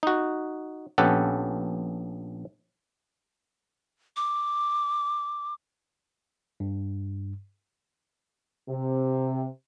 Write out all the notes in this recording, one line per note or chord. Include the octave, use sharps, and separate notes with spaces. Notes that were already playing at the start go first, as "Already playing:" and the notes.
D#4 F#4
A#1 B3 C#4 G4 A4 F#5
D6
G2
C3